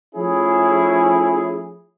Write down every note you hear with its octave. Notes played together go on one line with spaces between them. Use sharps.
F3 A3 C#4 E4 G#4